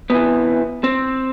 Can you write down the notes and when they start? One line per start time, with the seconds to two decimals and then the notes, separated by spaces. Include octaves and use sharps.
0.10 C3 E3 B3
0.84 C4